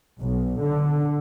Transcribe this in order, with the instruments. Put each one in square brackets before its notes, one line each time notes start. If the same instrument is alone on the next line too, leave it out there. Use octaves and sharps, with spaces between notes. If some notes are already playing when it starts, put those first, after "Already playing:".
[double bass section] B1
D3